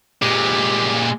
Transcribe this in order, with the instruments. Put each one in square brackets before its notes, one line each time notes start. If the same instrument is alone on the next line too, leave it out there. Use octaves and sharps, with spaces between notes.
[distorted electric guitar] A#2 G#3 [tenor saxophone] G4